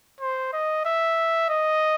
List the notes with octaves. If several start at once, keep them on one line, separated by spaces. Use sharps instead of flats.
C5
D#5
E5
D#5